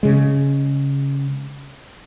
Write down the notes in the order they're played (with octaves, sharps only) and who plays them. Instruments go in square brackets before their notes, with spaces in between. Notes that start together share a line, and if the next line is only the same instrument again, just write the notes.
[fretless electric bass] C#3 G#3